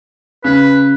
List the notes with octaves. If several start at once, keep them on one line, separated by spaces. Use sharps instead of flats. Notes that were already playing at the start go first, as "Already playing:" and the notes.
C#3 B4